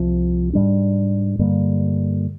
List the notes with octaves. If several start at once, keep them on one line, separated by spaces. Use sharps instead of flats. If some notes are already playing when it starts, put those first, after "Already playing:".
Already playing: C2 C3 F3
G#2 G3 D4
G2 D3 G3 A#3